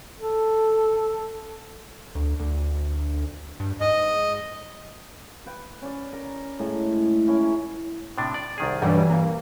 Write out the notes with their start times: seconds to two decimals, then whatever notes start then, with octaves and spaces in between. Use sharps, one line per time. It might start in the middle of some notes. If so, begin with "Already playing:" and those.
0.20 A4
2.15 D2
2.40 D2
3.60 G2
3.81 G#2 D#5
5.46 B4 G5
5.82 C#4 C#5 D5
6.12 A#4
6.59 A2 G#3
7.27 C#4 E4 A#4
8.18 A2 C3 D4
8.34 D5
8.58 C2 D#3 G#4
8.82 B1 G2 E3 F#3 G3
9.10 A#3